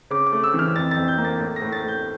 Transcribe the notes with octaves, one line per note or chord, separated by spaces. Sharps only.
C#3 D6
D6
A3
E6
E3 F6
F2 A6
F2 A6
G6
A#3
A6
A2 A6
A#6
A2
A6
A2 G6